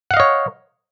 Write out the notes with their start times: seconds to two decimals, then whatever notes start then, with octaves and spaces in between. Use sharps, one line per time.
0.11 F#5
0.14 F5
0.17 D#5
0.20 C#5